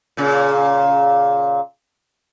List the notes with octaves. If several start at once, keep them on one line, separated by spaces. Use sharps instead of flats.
A#2 C#3